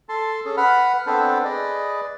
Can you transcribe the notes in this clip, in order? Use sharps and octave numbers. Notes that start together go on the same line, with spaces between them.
A4 A5 C6
C#4 G#4 A4
B4 F#5 B5 F6
B3 C4 D4 A4 B4 C5
G#4 B4 D5 D#5